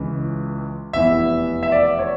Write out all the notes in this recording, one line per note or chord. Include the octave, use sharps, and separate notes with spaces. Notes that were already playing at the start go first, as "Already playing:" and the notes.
Already playing: C#2 C#3 E3
F1 E2 E3 E5
E5
D5
C#5